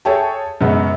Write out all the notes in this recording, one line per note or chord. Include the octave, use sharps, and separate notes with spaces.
G#4 A4 C#5 E5 G5 A5
F#2 C#3 G#3 B3